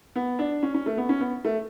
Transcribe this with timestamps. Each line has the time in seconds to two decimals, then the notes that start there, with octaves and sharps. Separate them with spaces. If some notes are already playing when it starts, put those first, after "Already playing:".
0.16 B3
0.39 D4
0.63 C#4
0.74 C#4
0.86 A3
0.97 B3
1.09 C#4
1.21 B3
1.45 A3